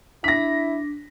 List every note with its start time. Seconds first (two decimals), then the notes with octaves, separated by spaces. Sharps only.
0.24 D4 E4 A#6 B6